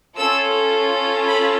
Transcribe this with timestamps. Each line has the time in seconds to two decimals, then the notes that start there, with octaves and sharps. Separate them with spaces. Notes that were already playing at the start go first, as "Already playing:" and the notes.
0.16 C#4 F4 A4 E6
1.26 B5